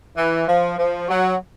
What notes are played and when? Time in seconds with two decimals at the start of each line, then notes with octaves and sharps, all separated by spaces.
0.16 E3
0.47 F3
0.78 F3
1.09 F#3